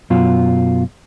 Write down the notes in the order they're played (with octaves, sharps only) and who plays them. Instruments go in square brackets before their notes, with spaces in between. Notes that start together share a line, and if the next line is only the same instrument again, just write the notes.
[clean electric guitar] F#2 B2 F4